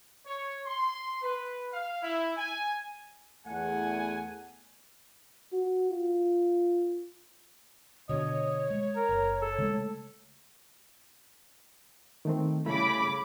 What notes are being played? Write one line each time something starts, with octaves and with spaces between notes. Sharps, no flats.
C#5
C6
B4
F5
E4
G#5
E2 A3 F#5 G#5
F#4
F4
B2 D3 C#5 D#5
G#3
A#4
F#1
A4
C#3 G#3 A3
D#3 A3 C4
C#3 G3 A3 E4 B5 D6